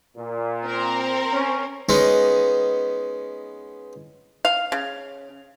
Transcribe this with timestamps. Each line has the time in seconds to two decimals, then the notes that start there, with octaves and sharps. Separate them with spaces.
0.16 A#2
0.63 C4 A#4
1.33 C#4
1.89 G#3 B3 C#4 D#4
4.45 F5
4.72 C#3